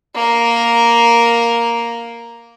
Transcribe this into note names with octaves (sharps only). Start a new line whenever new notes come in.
A#3 A#4